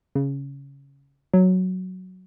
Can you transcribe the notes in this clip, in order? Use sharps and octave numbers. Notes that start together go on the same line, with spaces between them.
C#3
F#3